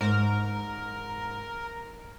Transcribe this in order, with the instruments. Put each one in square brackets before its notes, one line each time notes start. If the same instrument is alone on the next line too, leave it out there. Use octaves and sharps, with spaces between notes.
[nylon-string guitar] G#2 [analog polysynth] A#4